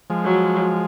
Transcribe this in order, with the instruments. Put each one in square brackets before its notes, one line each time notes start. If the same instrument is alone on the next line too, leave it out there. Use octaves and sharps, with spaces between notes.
[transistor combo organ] F3 G#3
[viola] F#3